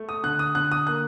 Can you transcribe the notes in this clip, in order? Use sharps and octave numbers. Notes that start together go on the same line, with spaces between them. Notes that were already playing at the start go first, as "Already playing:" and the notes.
Already playing: A3
D#6
D3 F#6
D#6
D3 F#6
D#6
A#3 F#6